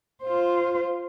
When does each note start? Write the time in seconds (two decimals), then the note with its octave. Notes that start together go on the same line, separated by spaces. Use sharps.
0.23 F4 C5